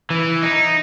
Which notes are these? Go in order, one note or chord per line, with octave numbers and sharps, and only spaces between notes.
E3
D#4